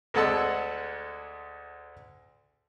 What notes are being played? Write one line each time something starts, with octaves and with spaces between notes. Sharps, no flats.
D2 G#3 A4 F#5 A5 E6